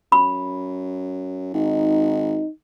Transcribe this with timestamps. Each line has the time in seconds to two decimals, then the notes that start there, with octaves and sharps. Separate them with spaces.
0.12 F#2 B5
1.54 G#1 D#4